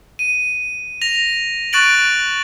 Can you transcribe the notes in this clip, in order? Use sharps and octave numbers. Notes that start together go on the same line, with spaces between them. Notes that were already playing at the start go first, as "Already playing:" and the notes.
D#7
A#6 F7
C#6 F#6 A6 D7 F#7